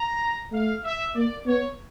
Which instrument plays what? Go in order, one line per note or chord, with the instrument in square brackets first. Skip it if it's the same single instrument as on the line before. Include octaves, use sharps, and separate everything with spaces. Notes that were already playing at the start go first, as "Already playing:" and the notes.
Already playing: [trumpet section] A#5
[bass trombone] A3 [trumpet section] F5
[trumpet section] E5
[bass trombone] A#3 [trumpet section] D5
[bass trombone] B3 [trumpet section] C#5